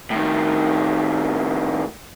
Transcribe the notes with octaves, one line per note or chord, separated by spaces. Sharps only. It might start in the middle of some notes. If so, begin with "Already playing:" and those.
A2 D#3